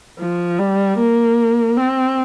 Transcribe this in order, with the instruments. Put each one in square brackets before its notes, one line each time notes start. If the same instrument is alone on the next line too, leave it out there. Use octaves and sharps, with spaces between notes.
[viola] F3
G3
A#3
C4